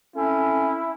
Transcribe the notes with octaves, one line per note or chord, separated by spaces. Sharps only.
A3 C4 C#4 E4